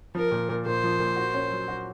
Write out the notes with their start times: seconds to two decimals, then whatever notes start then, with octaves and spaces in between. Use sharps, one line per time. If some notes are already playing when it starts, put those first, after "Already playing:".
0.15 F3 A#4
0.32 A#2
0.49 A#2
0.66 A#2 C5
0.84 F3
1.00 A#2
1.16 F#4
1.34 C#4
1.51 F#3
1.68 F#4